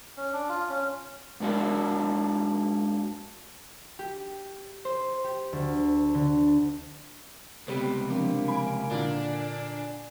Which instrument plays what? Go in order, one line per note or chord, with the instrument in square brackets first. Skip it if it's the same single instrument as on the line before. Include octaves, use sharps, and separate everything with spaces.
[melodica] C#4
D4
F4
C#4
[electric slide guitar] G#2 A#3 D4 F#4 A#4
[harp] G4
C5
G4
D2
D3
[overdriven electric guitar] C#2 C3 [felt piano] G3 B3 [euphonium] G4
[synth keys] F3 C4 D4 [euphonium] A#3
[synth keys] G#5 D7 [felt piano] B5
[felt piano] A#2 D3 [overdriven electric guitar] D4